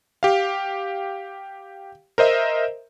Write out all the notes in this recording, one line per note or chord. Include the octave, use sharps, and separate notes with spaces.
G4 F5
A#4 C5 D#5 E5